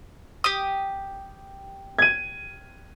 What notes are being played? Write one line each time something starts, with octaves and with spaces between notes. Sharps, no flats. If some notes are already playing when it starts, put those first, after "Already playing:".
G4 D#6
G#6 D#7